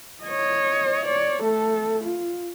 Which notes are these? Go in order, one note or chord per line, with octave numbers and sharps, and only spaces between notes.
C#5 D#5
C#5 D5
A3 A4
F4